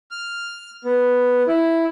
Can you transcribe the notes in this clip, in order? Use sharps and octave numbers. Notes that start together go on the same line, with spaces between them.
F6
B3
E4